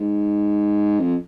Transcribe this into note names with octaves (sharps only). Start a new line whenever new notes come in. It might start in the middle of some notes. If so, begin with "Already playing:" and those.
Already playing: G#2
F2